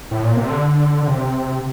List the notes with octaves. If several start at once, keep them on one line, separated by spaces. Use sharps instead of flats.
A2
A#2
C3
D3
D3
C3